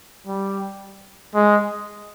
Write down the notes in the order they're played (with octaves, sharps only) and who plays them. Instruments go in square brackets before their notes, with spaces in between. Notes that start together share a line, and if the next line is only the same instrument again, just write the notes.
[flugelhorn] G3
G#3